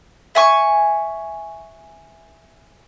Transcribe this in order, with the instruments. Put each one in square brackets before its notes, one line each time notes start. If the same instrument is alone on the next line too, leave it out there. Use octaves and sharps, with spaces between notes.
[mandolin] E5 G#5 C#6